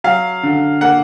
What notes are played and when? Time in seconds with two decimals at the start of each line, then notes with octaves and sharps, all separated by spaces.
0.04 F#3 F5
0.43 D3
0.81 A#3 F#5